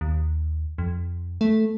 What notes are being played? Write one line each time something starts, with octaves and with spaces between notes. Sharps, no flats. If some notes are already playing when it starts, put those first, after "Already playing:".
D#2
F2
A3